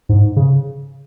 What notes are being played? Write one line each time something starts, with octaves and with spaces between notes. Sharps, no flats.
G#2
C#3